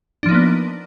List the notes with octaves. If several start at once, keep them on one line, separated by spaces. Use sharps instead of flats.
F3 A#3 B3 D4 D#4